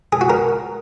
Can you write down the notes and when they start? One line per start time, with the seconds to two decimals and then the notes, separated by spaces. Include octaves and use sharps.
0.13 G#4
0.21 F#4
0.30 A#4